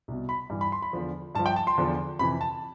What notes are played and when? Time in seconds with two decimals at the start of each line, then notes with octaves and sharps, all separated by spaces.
0.08 C2 B2
0.29 B5
0.50 G2 E3
0.61 B5
0.72 C6
0.82 B5
0.93 E2 D3 F3
1.35 G2 A5
1.39 F3
1.46 G5
1.56 A5
1.67 C6
1.77 E2 D3 F3
2.19 F2 C3 E3 B5
2.41 A5